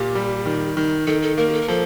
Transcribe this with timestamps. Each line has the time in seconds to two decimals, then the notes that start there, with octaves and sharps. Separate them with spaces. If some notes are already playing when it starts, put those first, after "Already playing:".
Already playing: A#2 F4 G4
0.15 G3
0.46 D#3
0.77 D#3
1.07 D#3 A4
1.22 A4
1.38 A#3 A#4
1.49 G4
1.53 A4
1.62 A#4
1.68 F3 A4